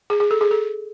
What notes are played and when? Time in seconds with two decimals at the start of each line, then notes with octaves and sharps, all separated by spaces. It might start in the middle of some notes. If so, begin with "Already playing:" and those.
0.10 G#4
0.20 G#4
0.31 A4
0.41 G#4
0.51 A4